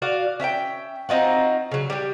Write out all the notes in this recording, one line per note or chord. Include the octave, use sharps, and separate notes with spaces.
F#4 D5 F5
C#4 E5 F5 G5
C4 D#4 F4 F#4
C#3 F#3
G3 G4